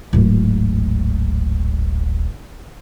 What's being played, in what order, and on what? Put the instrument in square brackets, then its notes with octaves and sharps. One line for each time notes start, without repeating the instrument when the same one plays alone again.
[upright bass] D1 G#1